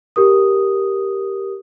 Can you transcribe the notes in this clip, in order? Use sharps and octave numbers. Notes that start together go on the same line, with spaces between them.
G4 A#4 D#6